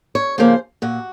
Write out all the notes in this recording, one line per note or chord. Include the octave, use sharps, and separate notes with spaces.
C#5
C#3 F3 A#3 C5
A#2 F#4